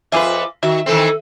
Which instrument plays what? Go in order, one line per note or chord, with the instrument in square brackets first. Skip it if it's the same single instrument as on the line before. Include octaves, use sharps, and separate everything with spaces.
[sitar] F2 B4 [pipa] F4 G#4 E5 [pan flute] D6
[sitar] D#3 [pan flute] F#4 [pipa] E5
[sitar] D#3 E3 C4 [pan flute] A4